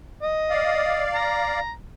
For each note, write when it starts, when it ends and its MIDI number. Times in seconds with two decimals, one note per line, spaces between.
0.22 1.02 75
0.50 1.60 74
0.50 1.60 77
1.15 1.71 82